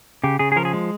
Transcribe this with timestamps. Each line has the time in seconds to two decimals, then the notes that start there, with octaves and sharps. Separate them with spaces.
0.23 C#3 G4
0.39 C#3 G#4
0.52 G#4
0.56 F3 A#4
0.65 G#4
0.73 G#3